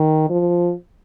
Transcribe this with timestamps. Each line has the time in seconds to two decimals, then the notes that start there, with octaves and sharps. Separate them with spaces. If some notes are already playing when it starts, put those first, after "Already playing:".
Already playing: D#3
0.30 F3